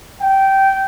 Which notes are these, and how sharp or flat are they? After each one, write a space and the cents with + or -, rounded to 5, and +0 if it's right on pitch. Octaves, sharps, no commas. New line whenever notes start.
G5 -15